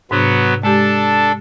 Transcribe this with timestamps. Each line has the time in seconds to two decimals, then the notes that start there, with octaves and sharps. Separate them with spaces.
0.11 G#2 C3 F#3 B3 D4
0.63 G#3 D4 G4 A4